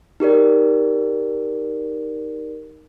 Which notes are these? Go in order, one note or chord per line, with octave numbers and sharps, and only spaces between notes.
D#4 G4 A#4 D5